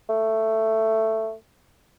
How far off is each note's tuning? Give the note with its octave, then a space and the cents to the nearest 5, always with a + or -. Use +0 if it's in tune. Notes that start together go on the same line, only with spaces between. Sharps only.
A3 +10